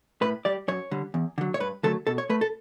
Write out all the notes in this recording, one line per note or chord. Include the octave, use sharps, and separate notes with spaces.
A2 B4
G3 D5
F#2 C#5
D3 G3
E2
D3 F#3
C#5
G2 B4
D3 F#3 A3 A4
B2 A4
C#5
A3 B4
A4